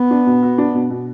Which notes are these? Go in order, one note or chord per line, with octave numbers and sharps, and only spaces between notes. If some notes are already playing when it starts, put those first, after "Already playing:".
Already playing: B3
D4
B2
F#4
D4
B2
B2